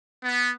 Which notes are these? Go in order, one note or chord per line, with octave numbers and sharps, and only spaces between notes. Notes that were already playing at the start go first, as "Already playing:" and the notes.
B3